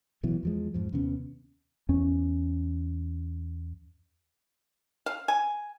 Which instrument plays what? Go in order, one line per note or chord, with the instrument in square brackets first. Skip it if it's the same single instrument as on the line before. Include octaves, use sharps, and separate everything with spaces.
[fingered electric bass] A1 B2 E3 F#3
E2 F3 G#3
F2 G#2 F3
D#2 C3 B3 C#4
[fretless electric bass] E2 C#4
[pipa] F5
G#5